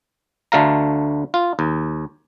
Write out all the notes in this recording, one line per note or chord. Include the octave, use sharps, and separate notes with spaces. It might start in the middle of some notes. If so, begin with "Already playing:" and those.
D2 D3 A3 F5 A#5
F4
D#2